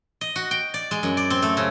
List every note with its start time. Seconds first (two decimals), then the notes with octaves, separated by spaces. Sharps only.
0.21 D#5
0.36 F#4
0.51 G5
0.74 D5
0.91 G#3
1.03 F#2
1.17 D5
1.30 C4
1.42 A3
1.57 C#3